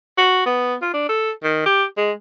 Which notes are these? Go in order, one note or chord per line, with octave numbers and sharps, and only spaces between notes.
F#4
B3
F4
D4
A4
D#3
G4
G#3